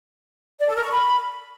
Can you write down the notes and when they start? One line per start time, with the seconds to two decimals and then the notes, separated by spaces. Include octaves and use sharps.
0.60 D5
0.68 A4
0.75 A#4
0.83 C#6
0.91 B5